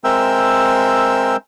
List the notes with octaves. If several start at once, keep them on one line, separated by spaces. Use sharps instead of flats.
G#3 C4 A#4 E5 G5 E6